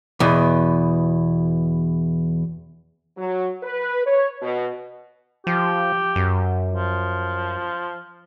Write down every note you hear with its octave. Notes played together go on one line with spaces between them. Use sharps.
E2 B2
F#3
B4
C#5
B2
F3 G4
F#2
F3